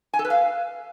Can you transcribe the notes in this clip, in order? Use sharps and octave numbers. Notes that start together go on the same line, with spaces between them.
G#5
A4
B4
F5